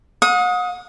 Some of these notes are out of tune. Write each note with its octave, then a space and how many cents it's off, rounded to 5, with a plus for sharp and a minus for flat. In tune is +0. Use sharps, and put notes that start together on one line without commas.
F#5 -40 D#6 +20